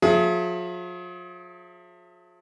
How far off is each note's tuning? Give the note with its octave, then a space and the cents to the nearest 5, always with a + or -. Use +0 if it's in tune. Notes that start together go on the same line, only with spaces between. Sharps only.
F3 +40 G#4 +35 E5 +30